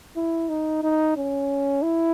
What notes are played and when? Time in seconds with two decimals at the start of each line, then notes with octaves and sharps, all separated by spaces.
0.16 E4
0.49 D#4
0.83 D#4
1.17 C#4
1.82 E4